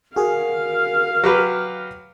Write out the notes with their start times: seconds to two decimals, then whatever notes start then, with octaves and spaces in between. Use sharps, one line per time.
0.16 F#4 G#4 A#4 F5
1.24 F#3 G4 B4